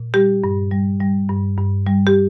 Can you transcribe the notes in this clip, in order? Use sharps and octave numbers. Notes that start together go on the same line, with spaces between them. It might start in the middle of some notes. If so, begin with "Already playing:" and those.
Already playing: A#2
G3 G4
G2
G3
G3
G2
G2
G3
G4